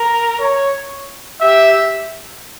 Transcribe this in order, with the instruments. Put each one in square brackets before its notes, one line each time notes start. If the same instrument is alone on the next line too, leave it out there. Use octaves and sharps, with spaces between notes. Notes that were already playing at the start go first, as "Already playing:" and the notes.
Already playing: [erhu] A#4
[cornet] C#5
[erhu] G4 [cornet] E5